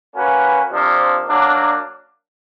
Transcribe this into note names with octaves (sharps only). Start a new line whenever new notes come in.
A#3 C#4 F#4 B4
C3 F3 A#3 D4
F#3 A#3 D4